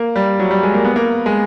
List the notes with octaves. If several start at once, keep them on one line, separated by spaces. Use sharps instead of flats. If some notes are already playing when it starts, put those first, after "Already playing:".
Already playing: A#3
G3
F#3
G3
G#3
A#3
B3
A#3
G#3